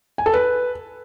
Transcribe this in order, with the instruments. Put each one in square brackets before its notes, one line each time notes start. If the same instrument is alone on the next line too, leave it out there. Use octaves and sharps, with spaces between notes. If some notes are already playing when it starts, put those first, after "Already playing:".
[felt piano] G#5
A4
B4